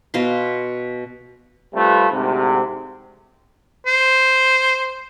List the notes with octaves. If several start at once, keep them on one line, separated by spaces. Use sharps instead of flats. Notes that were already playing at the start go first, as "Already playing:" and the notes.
B2 F5 C6
C3 G3 A3 F4 B4
D2 G#2 C3
C5